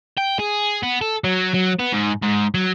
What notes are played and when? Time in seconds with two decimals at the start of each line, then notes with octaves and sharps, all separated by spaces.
0.17 G5
0.39 G#4
0.83 B3
1.01 A4
1.24 F#3
1.54 F#3
1.79 B3
1.93 G#2
2.22 G#2
2.54 F#3